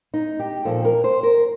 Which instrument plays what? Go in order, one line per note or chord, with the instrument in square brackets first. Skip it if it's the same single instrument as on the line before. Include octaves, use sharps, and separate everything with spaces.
[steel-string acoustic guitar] D#4
G4
A#2 F3 A#3 A4
A#4
C5
A#4